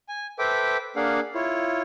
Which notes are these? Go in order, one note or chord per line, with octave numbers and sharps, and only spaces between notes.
G#5
A4 B4 C5 E5 G5 D6
A#3 D4 G#4 F5 F#5
E4 F4 C#5